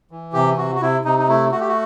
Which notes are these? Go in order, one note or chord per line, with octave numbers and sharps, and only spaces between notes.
E3
C3 G4
C3 F#4
F#4
C3 E4
C3 D#4
D#4
A3 E4
A3 F#4
G4
F#4